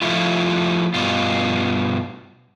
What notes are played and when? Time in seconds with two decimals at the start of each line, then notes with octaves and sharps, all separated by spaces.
0.02 F3 A3 E4 F4
0.94 G2 B2 F4